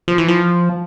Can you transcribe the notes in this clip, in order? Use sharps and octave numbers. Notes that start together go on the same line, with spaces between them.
F3
E3
F3